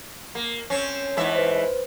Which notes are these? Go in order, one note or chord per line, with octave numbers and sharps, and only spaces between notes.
A#3
C4 C#4
G#2 E3 E5
B4 C5